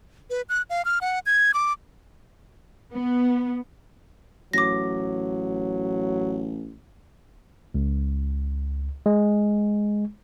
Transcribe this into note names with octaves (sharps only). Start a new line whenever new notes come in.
B4
F#6
F5
F6
F#5
G#6
D6
B3
A1 F#3 D6 A#6
C#2
G#3